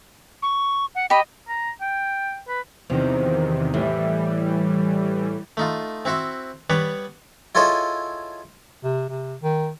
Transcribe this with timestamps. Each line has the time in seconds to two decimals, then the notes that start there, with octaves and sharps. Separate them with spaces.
0.43 C#6
0.95 F#5
1.10 G4 D#5 B5
1.48 A#5
1.81 G5
2.48 B4
2.90 E2 C3 D#3 F3
3.74 A2 E3 G3
5.57 A3 D#4 F4
6.05 C4 E4 F#4 C5 E5
6.70 G3 B3 B4 C#5 D5
7.55 E4 F4 G#4 A4 C#5 D#5
8.84 C3
9.09 C3
9.43 D#3